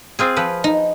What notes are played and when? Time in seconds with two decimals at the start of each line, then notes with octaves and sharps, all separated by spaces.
0.19 C4 F4 G#4
0.36 F3 B4
0.64 D#4